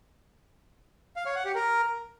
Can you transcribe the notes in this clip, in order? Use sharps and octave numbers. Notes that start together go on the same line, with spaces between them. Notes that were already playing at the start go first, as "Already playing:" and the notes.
F5
C#5
F#5
G4
A#4